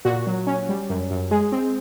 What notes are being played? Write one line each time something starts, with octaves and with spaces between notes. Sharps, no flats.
A#2 F#4
F#3
C#4
G3
F#2
F#2
G#3 G#4
C4